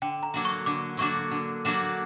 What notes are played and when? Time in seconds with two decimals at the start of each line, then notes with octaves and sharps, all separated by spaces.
0.02 D3 G5
0.23 A#5
0.34 F#3 A#3 D4 F#4
0.45 C#6
0.66 D3 D6
0.97 F#3 A#3 D4 F#4 C#6
1.31 D3
1.65 F#3 A#3 D4 F#4